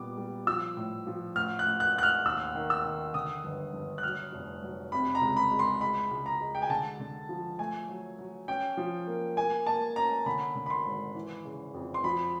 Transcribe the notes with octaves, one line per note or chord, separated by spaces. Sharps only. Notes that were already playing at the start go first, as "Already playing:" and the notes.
Already playing: A#2 G3 B3 D6
G3
F3 E6
A2
F3
A1 F6
F#6
A1
F#6
A1 F#6
F6
D#2 E6
D#3
E6
D#3
D3 D#6
G1
G1
F#6
F#3 F6
F1
F#3
C3 B5
A#5
C#2
B5
G#3
C6
G#3 B5
C#2
A#5
G#3
G5
G#5
D3 A5
D3
F3
A3 G#5
F#3
F#3
C#4 G5
F3
A#3
A#3 G#5
A#3 A5
C#4 A#5
D3 B5
D3
B5
C6
G#1
E3
C#3
F2
C6
F3 B5